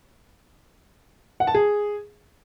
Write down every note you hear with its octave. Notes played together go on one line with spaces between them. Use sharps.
F#5
A5
G#4